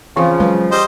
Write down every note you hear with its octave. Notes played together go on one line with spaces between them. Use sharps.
C#3 E3 F3 C4 F5
F#3 G#3 G#4 B4
G3 C5 D#5